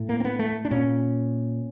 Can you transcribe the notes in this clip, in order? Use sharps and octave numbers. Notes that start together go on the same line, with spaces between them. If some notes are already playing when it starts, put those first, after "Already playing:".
Already playing: A2
A#3
C4
B3
A3
D4
A#2 C#4